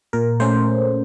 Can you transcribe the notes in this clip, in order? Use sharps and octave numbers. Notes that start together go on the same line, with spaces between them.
A#2 A#4
A3 C#4 C5